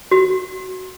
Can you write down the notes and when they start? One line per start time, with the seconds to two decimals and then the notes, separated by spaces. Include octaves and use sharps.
0.11 F#4